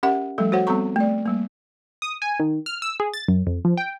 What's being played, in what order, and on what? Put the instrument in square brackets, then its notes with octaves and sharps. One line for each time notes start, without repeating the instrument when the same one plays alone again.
[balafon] C#4 G4 A#4 E5 F#5
F3 G3 A3 A4
F#4 C5 C#5 F#5
G3 B3 C4 A4 A#5 C#6
A3 D5
G3 A#3
[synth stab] D#6
G#5
D#3
F6
E6
G#4
A6
F#2
F2
F3
G5